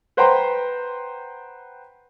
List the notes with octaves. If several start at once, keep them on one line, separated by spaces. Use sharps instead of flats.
B4 C5 F#5 G5 A#5 C6